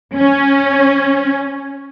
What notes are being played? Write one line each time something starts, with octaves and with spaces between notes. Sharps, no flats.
C#4